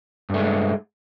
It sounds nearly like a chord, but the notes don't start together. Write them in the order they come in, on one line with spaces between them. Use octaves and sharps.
G2 A3 G#3